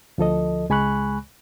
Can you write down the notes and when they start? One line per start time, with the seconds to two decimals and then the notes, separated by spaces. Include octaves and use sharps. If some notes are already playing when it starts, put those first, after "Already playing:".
0.18 D2 F3 A4 D#5
0.69 C#2 G#3 G#5 B5 C#6 F#6